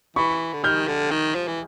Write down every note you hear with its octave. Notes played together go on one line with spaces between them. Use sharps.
E3 B5 C#6
D3
D#3 F6 G6
D3
D#3
F3
E3